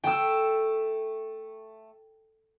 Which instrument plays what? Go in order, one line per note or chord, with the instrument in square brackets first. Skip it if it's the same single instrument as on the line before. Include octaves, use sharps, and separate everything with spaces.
[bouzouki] A3 [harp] G5 E6